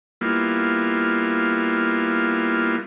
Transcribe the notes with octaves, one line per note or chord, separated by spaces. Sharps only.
G3 A#3 B3 E4 F4